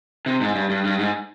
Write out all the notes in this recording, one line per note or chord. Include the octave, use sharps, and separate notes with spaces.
C3
G#2
G2
G2
G2
G#2